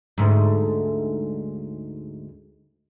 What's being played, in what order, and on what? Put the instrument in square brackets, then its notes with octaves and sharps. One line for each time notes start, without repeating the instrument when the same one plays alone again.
[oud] D2 G#2